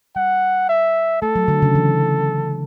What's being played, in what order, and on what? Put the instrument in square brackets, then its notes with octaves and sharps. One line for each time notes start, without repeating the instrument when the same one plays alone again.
[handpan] G3 [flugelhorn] F#5
[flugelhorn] E5
[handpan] A3 [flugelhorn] A4
[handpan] F#3
D3
C#3
E3